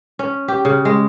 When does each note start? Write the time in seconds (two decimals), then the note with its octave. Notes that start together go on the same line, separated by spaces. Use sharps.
0.19 C#4
0.48 G4
0.65 C#3
0.85 G#3